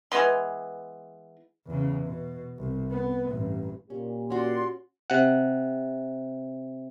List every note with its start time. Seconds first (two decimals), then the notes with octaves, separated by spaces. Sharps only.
0.12 E3 G#3 B3 C6
1.67 E2 C#3
2.05 B2
2.59 C2
2.91 B3
3.28 A1 G2
3.90 A#2 C#4 G4
4.30 C#4 F#4 D5 F#5 C6
5.10 C3 F#5